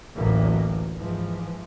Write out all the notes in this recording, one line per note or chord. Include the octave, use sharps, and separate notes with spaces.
A1 D2 A2 E3 F#3 A#3
G#2 E3 F3